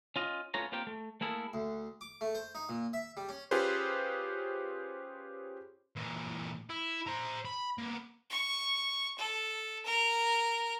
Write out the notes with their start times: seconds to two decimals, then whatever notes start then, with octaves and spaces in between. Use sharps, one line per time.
0.16 C#4 F4 D#5
0.54 A3 B3 C#4 F4 C#5 A#5
0.72 A#3 C4 F4 G4 A#4 G5
0.87 A3
1.21 A3 A#3 E4 G#4 A4
1.54 D2
2.01 D6
2.21 A3
2.35 C5
2.55 D#4
2.69 A#2
2.93 E5
3.17 G3
3.29 C#4
3.51 C#4 F4 G4 G#4 B4 C5
5.96 A#2 E3
6.70 E4
7.07 C5 A#5
7.45 B5
7.78 A#3 B3
8.30 C#6
9.19 A4
9.85 A#4